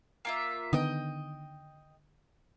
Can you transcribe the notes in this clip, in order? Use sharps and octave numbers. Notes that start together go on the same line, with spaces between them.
A#3 F4 E5
D3 D#3 B3 D#5 G5